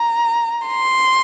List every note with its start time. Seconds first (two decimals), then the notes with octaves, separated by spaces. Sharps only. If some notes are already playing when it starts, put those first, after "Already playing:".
Already playing: A#5
0.67 C6